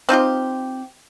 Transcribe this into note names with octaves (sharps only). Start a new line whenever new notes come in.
C4 D#4 F4 G4